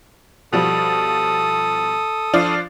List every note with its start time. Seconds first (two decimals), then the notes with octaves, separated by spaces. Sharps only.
0.53 B2 F3 G3 A4 D#6
2.33 F3 D4 F4